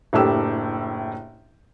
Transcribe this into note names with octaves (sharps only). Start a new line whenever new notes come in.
F#1 A2 D4 G4 E6